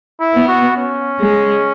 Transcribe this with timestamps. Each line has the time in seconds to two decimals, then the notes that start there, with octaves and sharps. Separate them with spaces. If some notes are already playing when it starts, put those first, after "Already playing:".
0.20 E4
0.34 B3
0.48 F#4
0.77 C#4
1.19 G#3